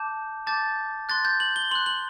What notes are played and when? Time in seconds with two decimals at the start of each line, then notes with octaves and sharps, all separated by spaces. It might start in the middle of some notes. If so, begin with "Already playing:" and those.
Already playing: A5 D6 G6
0.47 A5 D6 G6 A6
1.09 C6 F#6 A6
1.25 G6
1.40 F#7
1.56 G7
1.71 C6 F#6 F#7
1.86 F#7